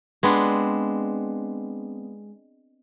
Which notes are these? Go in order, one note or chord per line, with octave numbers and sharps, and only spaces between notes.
G#3 B3 C4 D4